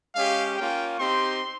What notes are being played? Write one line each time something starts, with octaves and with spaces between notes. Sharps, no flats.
G#3 C#4 G4 F5
A#3 C#4 F4 G5
C4 D#4 G4 C6